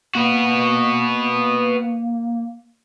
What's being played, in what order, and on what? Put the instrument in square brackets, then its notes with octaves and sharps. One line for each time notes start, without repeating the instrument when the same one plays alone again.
[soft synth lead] A#3 [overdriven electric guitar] B3 F#4